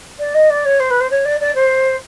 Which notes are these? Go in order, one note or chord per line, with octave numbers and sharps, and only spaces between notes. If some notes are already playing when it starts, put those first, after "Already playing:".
D5
D#5
D5
C#5
C5
B4
C5
C#5
D5
D5
C5